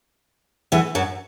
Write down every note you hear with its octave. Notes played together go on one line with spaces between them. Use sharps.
E2 E3
F#2 F#3